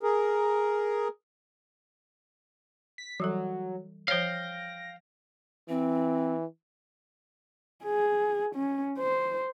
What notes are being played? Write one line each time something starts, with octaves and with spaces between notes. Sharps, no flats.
G#4 A#4
B6
E3 F#3 G3 A4
F3 C5 C#5 F5 G5 A#6
E3 C4
G#4
C#4
C5